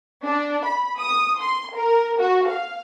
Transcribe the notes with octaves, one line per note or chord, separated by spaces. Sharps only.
D4
B5
D#6
C6
A#4
F#4
F5